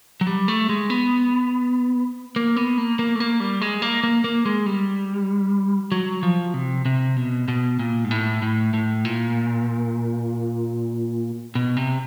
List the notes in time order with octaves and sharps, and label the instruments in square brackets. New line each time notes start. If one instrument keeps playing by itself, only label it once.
[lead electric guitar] F#3
G3
A3
G#3
B3
A#3
B3
A#3
A#3
A3
A#3
G3
G#3
A#3
A#3
A#3
G#3
G3
F#3
F3
C3
C3
B2
B2
A#2
G#2
A2
A2
A2
A#2
B2
C3